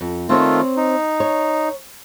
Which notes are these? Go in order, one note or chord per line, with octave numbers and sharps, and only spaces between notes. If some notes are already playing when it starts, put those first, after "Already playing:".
F2
D#3 A3 C4 F4 C5 C#5
D#4
C#5